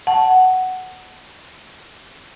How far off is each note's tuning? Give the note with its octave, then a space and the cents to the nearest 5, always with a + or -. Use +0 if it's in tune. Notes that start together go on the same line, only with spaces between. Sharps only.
F#5 +5 A5 -5